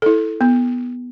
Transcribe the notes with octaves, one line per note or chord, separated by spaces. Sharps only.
E4 A4
B3